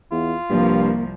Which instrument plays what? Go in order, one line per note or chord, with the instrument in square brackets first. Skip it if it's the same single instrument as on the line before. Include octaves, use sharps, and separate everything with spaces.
[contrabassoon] E2 [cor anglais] F4
[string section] C2 F3 [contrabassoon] G2 [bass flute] A#3